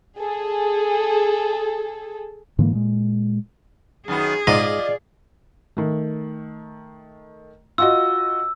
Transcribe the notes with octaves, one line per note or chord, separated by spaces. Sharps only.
G#4 A4
G#2 D3 E3 A#3
A#2 G#3
F#2 D#3 B3 G#4
G#2 F4 D5 D#5
D#3 A3
F4 F#4 D#5 E6